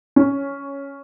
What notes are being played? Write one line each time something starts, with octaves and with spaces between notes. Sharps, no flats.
C#4